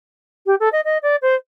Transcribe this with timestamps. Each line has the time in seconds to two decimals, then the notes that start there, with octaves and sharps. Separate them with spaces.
0.46 G4
0.60 A4
0.72 D#5
0.85 D#5
1.03 D5
1.22 C5